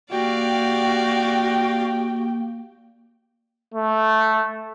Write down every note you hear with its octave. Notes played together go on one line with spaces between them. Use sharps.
A#3 F#4 G4 D5 F5 G5
A3